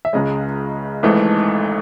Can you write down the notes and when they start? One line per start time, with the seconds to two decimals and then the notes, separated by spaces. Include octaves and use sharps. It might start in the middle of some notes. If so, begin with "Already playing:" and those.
0.05 E5
0.13 C#2 C#3 G#3 D#5
1.03 G#1 G#2 E3 A3